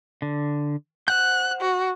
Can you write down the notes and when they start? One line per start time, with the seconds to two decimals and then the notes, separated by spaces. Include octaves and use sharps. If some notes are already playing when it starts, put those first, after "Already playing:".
0.22 D3
1.08 C5 F#5 F#6 G6
1.61 F#4